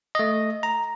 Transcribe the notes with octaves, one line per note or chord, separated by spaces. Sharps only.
A3 D#5
A#5